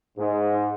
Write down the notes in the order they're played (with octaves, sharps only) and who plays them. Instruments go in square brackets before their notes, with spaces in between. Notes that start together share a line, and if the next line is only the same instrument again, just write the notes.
[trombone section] G#2